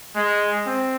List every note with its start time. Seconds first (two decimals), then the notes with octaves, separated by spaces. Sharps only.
0.16 G#3
0.67 C4